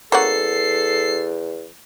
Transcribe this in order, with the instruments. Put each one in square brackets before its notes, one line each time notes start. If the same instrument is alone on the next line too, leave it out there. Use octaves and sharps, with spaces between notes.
[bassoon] E2 [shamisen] A#3 C#4 F#4 [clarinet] A4 [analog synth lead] C7